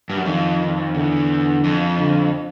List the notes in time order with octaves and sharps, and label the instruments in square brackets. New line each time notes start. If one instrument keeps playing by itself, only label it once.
[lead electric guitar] G2
F#2
[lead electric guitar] F2 [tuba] D#3
[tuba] D#3
[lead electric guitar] E2 [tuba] D3
[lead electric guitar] F2
[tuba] D3